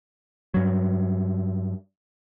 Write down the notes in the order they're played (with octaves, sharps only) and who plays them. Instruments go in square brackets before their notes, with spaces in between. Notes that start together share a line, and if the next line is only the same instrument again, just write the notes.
[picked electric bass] G2 F#3